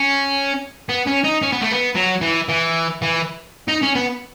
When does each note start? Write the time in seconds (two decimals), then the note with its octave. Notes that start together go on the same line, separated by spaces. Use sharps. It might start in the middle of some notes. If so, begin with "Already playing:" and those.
Already playing: C#4
0.89 B3
1.07 C#4
1.24 D#4
1.42 C#4
1.52 B3
1.62 A3
1.72 B3
1.96 F#3
2.22 E3
2.49 E3
3.02 E3
3.68 D#4
3.83 C#4
3.96 B3